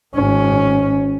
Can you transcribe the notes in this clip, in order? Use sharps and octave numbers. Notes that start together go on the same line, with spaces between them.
G#1 C#4